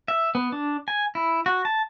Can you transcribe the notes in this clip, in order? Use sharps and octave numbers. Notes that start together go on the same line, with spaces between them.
E5
B3
D4
G#5
E4
F#4
A5